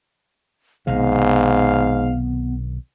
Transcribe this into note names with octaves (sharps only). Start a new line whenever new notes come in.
B1 G#2 C3 D#3 B3 F5